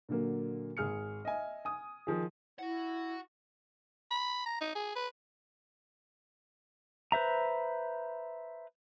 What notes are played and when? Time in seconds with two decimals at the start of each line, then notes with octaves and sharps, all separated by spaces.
0.09 A#2 D3 F#3 A#3
0.77 G#1 G#4 F6 C#7
1.25 D#5 E5 G#5
1.65 G#5 D#6
2.07 D#3 F3 G#4
2.59 E4 F#4 F#5
4.11 B5
4.46 A#5
4.61 D#4
4.75 G#4
4.96 B4
7.12 B4 C5 E5 A#5